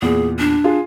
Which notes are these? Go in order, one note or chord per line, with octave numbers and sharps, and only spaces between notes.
E2 A#2 G#4
D4
F4 G#4